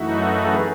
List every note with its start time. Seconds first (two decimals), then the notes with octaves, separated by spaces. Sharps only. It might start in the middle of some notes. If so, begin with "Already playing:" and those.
Already playing: F#2 E3 A3 D#4 E4 F#4
0.45 A4
0.54 G#4 B4